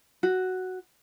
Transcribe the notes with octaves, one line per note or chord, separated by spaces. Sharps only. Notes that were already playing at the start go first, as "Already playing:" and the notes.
F#4